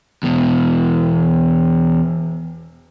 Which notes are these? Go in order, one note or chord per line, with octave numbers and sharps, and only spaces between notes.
E2 B2